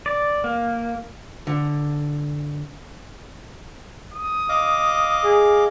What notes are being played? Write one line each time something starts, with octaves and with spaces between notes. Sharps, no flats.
D5
A#3
D3
D#6
D#5 F5 D6
G#4